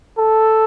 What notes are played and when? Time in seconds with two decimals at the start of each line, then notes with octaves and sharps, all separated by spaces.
0.18 A4